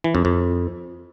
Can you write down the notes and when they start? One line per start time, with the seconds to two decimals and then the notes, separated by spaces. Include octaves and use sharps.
0.04 E3
0.15 F2
0.25 F2